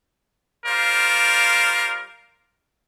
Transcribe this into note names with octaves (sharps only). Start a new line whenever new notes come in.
G3 F4 A#4 C5 D5 F5